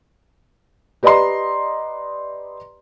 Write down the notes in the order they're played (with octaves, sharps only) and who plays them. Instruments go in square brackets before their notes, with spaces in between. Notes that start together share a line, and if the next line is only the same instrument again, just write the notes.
[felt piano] G4 B4 D5 D#5 A#5 C6